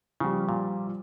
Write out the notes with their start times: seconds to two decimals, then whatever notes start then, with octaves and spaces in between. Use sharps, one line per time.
0.20 C#3 F3 G3
0.49 A#2